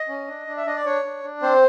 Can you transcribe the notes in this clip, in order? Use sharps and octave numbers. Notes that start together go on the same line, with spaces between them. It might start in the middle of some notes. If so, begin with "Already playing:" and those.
Already playing: D#5
C#4
D4
D4
E5
D4 D#5
D5
D4 C#5
D4
D4
C4 C5